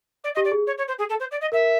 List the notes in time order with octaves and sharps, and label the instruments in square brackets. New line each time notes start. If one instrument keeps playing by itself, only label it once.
[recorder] D5
D#5
[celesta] G4
[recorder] D5
[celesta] G#4
[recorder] C#5
C#5
C5
G#4
A4
C5
D5
D#5
[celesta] A#4 [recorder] E5